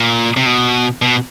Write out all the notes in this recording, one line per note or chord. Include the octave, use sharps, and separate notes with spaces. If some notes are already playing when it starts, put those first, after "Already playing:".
Already playing: A#2
C3
B2
B2